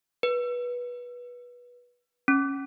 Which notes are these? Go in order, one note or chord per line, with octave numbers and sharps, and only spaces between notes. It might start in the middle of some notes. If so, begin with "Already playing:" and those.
B4
C#4